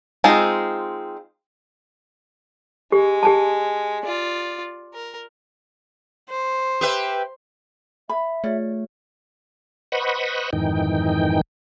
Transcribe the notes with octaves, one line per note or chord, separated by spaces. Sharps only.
G#3 C4 D#4 F4
G#3 G4
G4 G#5 A5
F4 D5
A#4
C5
G4 B4 E5
E5 B5
A3 F4 G#4 C#5 D5
B4 C5 D#5 F#5 B5 C#6
F2 G#2 D#3 E3 D#4 G5